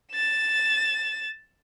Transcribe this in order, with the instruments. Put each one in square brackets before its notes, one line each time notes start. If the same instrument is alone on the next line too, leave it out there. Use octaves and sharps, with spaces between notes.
[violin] A6 E7